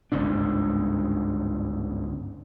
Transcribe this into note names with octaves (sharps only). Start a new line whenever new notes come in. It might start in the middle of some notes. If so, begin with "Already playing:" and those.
G1 C#2 G#2 D4